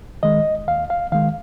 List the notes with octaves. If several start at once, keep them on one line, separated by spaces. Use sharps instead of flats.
D#3 G#3 D#5
D#2 F5
F5
D#3 G#3 F5